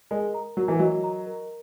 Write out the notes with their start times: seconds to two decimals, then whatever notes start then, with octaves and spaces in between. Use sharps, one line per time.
0.11 G#3 A#4
0.34 A#5
0.57 F#3 A#4
0.68 E3
0.79 F#3 D#5
1.04 A#5
1.26 A#4